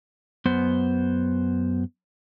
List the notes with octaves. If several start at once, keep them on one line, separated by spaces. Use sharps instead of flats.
F#2 B3 C5